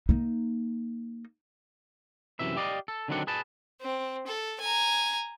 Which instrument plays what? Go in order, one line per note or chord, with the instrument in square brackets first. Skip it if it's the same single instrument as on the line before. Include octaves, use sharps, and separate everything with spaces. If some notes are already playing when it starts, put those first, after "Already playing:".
[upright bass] A#3 D#4
[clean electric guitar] F#2 C3 E3 E5
G4 D5 D#5 F5
A4
D3 D#3 F#3 C4 D4 F#5
G#4 B4 A5
[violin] C4
A4
G#5 A#5